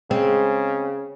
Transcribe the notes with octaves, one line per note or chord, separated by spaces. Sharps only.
C#3 G#3 C4